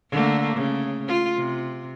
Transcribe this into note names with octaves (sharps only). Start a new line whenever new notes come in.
D3 A3 A#3
C#3
F4
C3